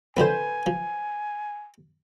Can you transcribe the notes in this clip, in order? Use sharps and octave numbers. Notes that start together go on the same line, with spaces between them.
D3 F3 C4 B4 C5 G#5
F3